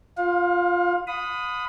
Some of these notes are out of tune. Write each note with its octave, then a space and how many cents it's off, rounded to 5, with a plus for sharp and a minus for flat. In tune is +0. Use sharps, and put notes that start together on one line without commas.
F4 +0 F5 +35
F#5 -45 B5 +20 D#6 +0